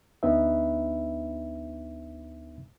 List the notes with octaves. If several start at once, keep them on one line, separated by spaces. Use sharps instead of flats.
D2 B3 D4 D#4 B4 E5